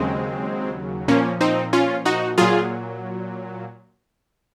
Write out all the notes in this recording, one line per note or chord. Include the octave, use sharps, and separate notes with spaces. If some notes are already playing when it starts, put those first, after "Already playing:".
Already playing: D#2 C#3 F#3 G#3 C4
A#2 F3 A#3 C#4
C4 D#4
C#4 F4
D#4 F#4
A#2 F#3 F4 G#4